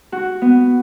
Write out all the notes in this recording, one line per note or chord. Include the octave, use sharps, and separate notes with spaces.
F#4
B3